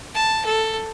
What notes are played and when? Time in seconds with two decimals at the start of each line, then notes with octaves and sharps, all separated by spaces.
0.15 A5
0.45 A4